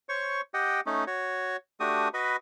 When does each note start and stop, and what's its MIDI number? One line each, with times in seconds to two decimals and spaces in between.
0.09 0.41 72
0.09 0.41 73
0.09 0.41 85
0.54 0.80 67
0.54 0.80 75
0.54 0.80 78
0.54 0.80 79
0.86 1.04 57
0.86 1.04 61
0.86 1.04 63
1.07 1.57 66
1.07 1.57 73
1.80 2.08 57
1.80 2.08 62
1.80 2.08 66
1.80 2.08 67
1.80 2.08 87
2.14 2.36 66
2.14 2.36 71
2.14 2.36 75
2.14 2.36 83